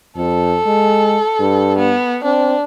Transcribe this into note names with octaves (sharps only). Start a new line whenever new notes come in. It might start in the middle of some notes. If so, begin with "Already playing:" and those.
F2 A4
G#3
G2
B3
C4 D4